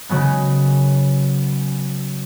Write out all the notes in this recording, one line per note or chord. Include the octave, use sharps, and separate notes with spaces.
C#3 F#3 G#3 B3